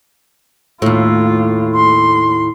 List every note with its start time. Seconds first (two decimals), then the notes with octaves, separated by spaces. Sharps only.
0.82 D#2 A2 F4
1.76 C6